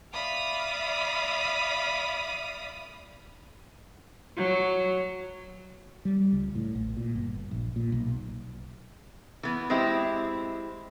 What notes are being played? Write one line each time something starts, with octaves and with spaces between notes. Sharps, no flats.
D5 E5 F5 B5 D#6
F#3
G3
C#2
A2
A1
A#2
G1
A#1
A#2
B1
E3 B3
G#3 C4 E4 G4